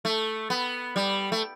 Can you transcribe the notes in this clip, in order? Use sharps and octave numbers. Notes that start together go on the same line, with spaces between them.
A3
B3
G3
A3